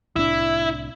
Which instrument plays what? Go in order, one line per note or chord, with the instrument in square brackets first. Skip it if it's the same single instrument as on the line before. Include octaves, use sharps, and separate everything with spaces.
[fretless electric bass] C2 A2 D4 [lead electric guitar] E4